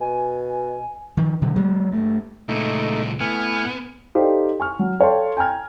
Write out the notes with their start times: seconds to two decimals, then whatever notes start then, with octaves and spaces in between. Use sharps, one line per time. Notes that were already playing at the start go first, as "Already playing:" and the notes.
0.01 B2 G#5
1.17 D#3 F3
1.41 B2 D3 F#3
1.56 F#3 G#3 A#3
1.92 G2 A3
2.49 C#2 A#2 A3 D#4
3.20 A2 B3 G#5 F6
4.15 D#4 G4 A4 C5 D5 F5
4.60 G#5 C#6 F6
4.79 F#3
5.00 A4 C#5 F5 G5 A5 C6
5.37 G5 G#5 A#5 F6 G#6